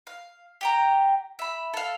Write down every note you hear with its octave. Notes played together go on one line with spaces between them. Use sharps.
F5
G4 G5 A#5
E5 B5
A4 F5